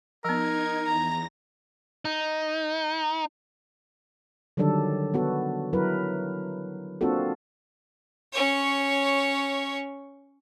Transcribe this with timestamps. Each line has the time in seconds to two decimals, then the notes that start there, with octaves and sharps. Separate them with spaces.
0.24 F3 B3 D#4 A#4 G#6
0.85 E2 A#5 A#6
2.05 D#4
4.57 D3 D#3 F#3 G3 D4 A4
5.14 B3 F#4 A4
5.73 F#3 E4 A#4 B4
7.01 A#3 C4 D4 F4 F#4 A4
8.33 C#4 C#5